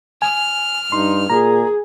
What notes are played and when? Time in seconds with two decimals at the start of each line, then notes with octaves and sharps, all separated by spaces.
0.22 G#5 F6
0.92 G2 D#4 C6
1.30 A#2 G#4 A#5